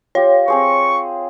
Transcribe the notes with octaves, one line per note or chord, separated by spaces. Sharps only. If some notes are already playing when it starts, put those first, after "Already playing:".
F4 G4 C#5
C4 G#4 C5 C#6